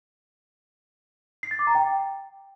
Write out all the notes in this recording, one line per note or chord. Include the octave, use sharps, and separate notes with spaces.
C7
A6
D6
A#5
G5